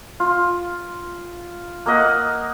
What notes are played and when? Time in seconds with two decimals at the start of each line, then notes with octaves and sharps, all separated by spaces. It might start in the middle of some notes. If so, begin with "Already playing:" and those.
0.20 F4
1.86 A#3 A#4 D#5 F#5